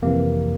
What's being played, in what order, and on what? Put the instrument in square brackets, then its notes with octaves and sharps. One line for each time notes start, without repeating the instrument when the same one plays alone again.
[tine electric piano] F2 C3 E3 A#3